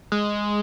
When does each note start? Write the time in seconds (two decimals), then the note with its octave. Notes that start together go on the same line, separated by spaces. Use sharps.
0.12 G#3